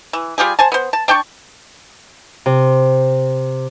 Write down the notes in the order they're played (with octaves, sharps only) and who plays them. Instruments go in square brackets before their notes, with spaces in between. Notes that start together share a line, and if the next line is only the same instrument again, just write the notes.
[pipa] E3
G3 F4 G4 G#4
C5 G#5 A5
B3 C5
A5
D4 G5 A5 C#6
[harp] C3